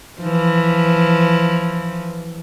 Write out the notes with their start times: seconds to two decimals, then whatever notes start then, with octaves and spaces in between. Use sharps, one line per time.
0.21 E3 F3